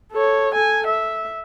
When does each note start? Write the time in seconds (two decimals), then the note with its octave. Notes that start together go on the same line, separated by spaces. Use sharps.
0.12 A4 C#5
0.54 A4 G#5
0.87 E5